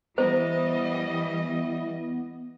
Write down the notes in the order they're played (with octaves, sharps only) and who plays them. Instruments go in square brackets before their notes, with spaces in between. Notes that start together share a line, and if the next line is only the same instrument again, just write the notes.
[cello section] E3 G3 D#5 [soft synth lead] B3 [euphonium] E4 [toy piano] C5